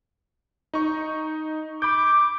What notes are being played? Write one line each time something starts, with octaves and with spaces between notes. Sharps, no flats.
D#4 C#6
B5 D6 G6